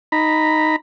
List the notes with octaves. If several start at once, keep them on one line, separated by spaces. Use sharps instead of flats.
D#4 A#5 B5